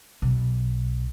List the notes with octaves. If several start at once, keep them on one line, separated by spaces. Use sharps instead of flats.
B1